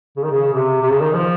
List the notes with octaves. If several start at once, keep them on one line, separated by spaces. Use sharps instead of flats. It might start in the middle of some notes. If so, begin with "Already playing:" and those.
C#3
D#3
C#3
C3
C3
C#3
D#3
F3